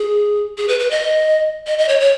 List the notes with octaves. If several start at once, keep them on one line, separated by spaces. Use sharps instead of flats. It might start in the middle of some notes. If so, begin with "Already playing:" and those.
Already playing: G#4
G#4
B4
B4
D#5
D#5
D#5
C#5
C#5